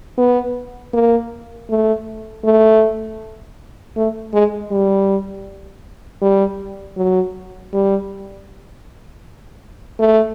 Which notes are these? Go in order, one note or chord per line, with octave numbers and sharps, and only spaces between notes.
B3
A#3
A3
A3
A3
G#3
G3
G3
F#3
G3
A3